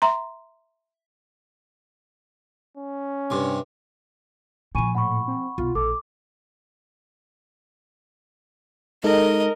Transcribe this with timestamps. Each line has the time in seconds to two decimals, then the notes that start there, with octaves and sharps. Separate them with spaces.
0.02 E5 A#5 C6
2.77 C#4
3.30 G2 C3
4.75 A#2 F3 G#5 B5 C#6 D#7
4.95 A2 F#5 B5 C#6
5.28 C4
5.58 B1 F4
5.75 A#1 A4 D6
9.04 G#3 D#4 A4 A#4 D#5